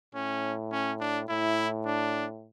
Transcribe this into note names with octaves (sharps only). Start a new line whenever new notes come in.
A2 C#4
C#4
D4
A2 E4
D4